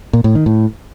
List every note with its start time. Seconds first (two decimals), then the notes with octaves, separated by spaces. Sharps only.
0.13 A#2
0.24 A2
0.35 D#3
0.46 A2